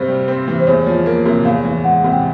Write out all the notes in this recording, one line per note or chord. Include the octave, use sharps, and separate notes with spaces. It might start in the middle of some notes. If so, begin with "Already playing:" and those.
Already playing: G2 C3 C5
G3
C4
E3
C5
E2 C#5
F3
A#3
C3
E2 F5
E3
G#3 F#5
C3
G5